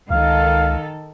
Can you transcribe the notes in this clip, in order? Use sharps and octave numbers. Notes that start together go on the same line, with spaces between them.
C#2 D#3 A4 F5